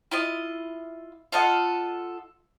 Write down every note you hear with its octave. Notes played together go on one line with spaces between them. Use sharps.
E4 F4 D#5
F4 A4 D#5 F#5